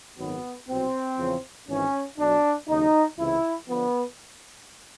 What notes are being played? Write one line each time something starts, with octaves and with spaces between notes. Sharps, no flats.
G#1 F#2 D#3 F#3 B3
C2 B2 F#3 C4
E2 C#3 F3
G#1 G#2 E3 C#4
B1 B2 F#3 D4
D#2 C#3 F#3 D#4
C#2 C3 E3 E4
D3 F3 B3